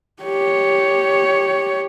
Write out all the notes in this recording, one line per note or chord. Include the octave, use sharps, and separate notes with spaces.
G4 C#5